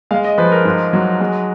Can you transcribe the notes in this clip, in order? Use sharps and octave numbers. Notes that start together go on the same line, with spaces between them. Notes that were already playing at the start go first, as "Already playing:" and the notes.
G#3 F5
D#5
F3 B4
A#4
G#2
F#3
G#3